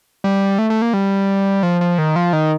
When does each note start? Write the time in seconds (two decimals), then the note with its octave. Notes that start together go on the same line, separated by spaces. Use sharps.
0.24 G3
0.59 A3
0.70 A3
0.82 A#3
0.94 G3
1.63 F3
1.81 F3
1.98 D#3
2.16 F3
2.33 D#3